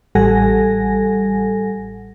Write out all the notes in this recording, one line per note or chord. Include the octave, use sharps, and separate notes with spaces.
A1 G3 A4 F#5 G#5 A#6